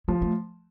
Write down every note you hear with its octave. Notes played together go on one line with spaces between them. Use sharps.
F3 G#3
A3